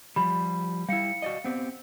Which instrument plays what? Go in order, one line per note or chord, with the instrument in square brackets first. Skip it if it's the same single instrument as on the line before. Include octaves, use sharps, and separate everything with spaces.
[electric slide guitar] F3 G3 [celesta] B5
[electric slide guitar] G3 E4 [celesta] F5 C#7
[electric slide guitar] F#4 D5 D#5
B3 C4 G4